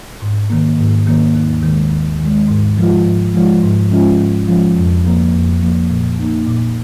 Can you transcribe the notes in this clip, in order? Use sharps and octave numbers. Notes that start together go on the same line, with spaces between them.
G#2
D#3 A#3
G#2
D#3 A#3
D#2
D#3 G#3
D#2
D#3 G#3
G#2
F3 G#3 F4
G#2
F3 G#3 F4
G#2
F3 G#3 C#4 F4
G#2
F3 G#3 C#4 F4
F2
F3 A#3
F2
F3 A#3
A#2
A#3 D#4
A#2